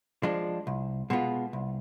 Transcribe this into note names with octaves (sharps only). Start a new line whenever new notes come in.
F3 G#3 D4
C2
B2 G#3 B3 F4
C2